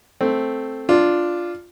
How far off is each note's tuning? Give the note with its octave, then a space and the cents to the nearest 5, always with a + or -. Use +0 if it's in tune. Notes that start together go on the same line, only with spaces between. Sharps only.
A3 +0 C4 +0
D4 +0 F4 +0